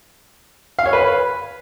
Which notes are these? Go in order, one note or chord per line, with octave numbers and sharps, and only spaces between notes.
F5
C#5
B4